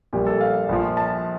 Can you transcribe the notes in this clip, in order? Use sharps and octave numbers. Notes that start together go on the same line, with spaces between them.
A#1 A#2 G3 G4
A4
F5
A#1 A#2 F3
A5